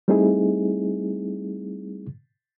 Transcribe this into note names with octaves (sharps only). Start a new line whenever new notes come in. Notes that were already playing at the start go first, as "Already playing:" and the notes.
G3 A3 C4 D#4 E4 G#4